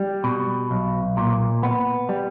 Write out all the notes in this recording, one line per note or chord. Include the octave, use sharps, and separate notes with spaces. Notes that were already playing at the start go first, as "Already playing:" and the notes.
Already playing: G3
B2
B1
A#2
B3
G3